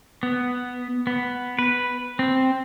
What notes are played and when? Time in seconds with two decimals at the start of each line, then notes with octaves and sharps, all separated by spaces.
0.23 B3
1.07 B3
1.59 B4
2.19 C4